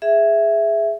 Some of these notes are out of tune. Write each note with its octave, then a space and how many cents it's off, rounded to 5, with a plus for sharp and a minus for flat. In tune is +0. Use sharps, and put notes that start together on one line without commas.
G#4 +0 E5 +5